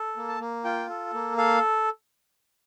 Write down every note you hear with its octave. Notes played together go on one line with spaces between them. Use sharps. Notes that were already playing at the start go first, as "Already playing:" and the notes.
Already playing: A4
A#3
A5
A#3
F4 G5
A4
A#3
A4 F5